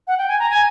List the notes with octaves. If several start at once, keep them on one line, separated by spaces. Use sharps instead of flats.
F#5
G5
G#5
A#5
G#5